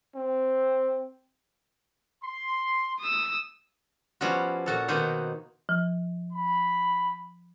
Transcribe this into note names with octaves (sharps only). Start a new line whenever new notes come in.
C4
C6
D#6 E6
F3 G3 B3 C#4 E4 F#4
A#2 F#4 A4
B2 D#3 A#3 D#4 C5 F#5
F3
B5